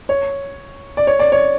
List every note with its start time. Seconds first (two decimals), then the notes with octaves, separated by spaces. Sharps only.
0.09 C#5
0.97 D5
1.07 C#5
1.19 D5
1.32 C#5